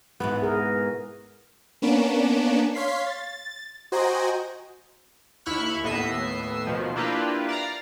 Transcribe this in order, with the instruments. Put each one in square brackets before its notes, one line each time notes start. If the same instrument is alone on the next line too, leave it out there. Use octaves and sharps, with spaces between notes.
[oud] G#2 B2 E3 [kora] B3
[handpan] G#4 A#4
[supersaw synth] A#3 B3 C#4 D4 D7 E7
C#5 F5 C6 B6 C7
A6
F#4 C5 D#5 G5 G#5 A#5
[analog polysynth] D#2 E4 B5 C#6 F6 F#6
D#2 A2 B3 D#5 E5 C7
B2 D#3 F3
A#3 D4 E4 F4 G4 B4
D5 F5 A#5